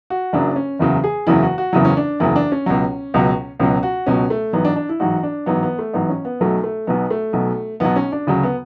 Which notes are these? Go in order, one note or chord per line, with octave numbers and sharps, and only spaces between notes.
F#4
F#1 F#2 C#3 F#3 D4
C#4
F#1 E2 C#3 F#3
G#4
F#1 E2 C#3 F#3 E4
F#4
F#4
F#1 E2 C#3 F#3 E4
C#4
D4
F#1 E2 C#3 F#3 E4
D4
C#4
C#2 B2 F#3
C#2 B2 F#3
C#2 B2 F#3 C#4
F#4
C#2 B2 F#3 C#4
A3
A1 G#2 F#3 B3
D4
D4
E4
A1 G#2 F#3 F#4
D4
A1 G#2 F#3 B3
B3
A3
A1 G#2 F#3 B3
C#4
B3
B1 B2 F#3 A3
A3
B1 B2 F#3 B3
A3
B1 B2 F#3
B1 B2 F#3 B3
C#4
D4
D2 C#3 F#3
B3